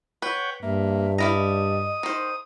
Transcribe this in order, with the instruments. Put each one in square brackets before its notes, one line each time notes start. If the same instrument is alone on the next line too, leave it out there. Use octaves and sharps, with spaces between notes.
[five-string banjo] B4 [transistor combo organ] C#5 F#5 G5
[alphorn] G2 [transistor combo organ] A#3 [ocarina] E5
[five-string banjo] G3 E4 A#5 [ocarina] D#5 [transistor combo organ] D#6
[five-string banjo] D#3 C5